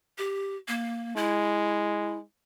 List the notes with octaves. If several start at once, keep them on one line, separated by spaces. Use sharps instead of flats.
G4
A#3
G#3 E4